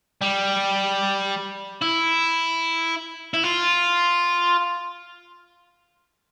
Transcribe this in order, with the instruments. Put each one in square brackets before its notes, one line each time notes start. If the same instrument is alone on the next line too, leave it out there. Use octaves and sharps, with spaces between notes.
[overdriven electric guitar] G3
E4
E4
F4